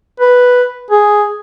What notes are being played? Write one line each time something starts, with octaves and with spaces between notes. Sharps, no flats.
B4
G#4